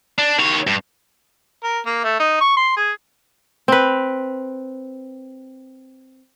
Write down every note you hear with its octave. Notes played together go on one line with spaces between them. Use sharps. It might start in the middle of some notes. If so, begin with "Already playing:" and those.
D4
D#3 C#5
G2
A#4
A#3
A3
D#4
C#6
C6
G#4
C4 B4